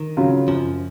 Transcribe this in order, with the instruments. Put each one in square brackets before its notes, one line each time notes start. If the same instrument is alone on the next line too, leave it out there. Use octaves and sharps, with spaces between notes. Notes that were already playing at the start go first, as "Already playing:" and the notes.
Already playing: [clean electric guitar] D#3
[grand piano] C#3 F#3 C#4 F4
[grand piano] F#2 [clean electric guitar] F3